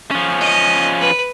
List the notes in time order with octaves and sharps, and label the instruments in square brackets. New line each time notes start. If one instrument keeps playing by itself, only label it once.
[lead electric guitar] F3 C#4
[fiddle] D#5
B4